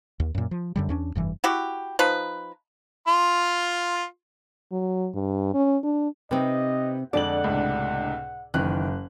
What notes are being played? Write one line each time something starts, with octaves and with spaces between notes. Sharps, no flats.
D#2
F#2 A#2
F3
F#2 D3 G3
E2 C#4 D4
F1 G2 E3
E4 F#4 G4
F3 D#4 B4
F4 C6
F#3
G2
C#4
D4
C3 C4 D#4 G4 B4 D#5
F2 D3 G#3 D4 D5 F#5 F#7
C#2 A2 C3
F#1 D#3 E3 F#6